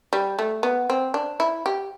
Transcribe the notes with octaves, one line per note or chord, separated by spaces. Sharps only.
G3
A3
B3
C4
D4
E4
G4